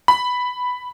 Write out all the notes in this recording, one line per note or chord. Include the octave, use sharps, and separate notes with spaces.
B5